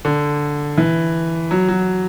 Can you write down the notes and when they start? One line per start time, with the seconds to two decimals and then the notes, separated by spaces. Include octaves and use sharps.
0.05 D3
0.78 E3
1.51 F#3
1.68 F#3